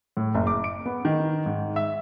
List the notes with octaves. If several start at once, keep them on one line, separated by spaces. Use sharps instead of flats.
A2
F#1
D6
D7
B3
D#3
G#2
E5